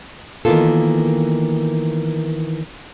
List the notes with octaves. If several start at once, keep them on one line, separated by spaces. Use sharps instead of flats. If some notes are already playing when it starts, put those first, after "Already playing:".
D#3 E3 A#3 B3 F4 A4